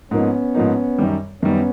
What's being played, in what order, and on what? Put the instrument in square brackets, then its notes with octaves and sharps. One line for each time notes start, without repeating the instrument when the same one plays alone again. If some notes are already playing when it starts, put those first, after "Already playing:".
[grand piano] G#2 F3 A#3 D#4 [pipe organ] B3 C#4
[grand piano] G#2 F3 A#3 D#4
F#2 D#3 G3
[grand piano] F#2 D#3 G3 [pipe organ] B3 C#4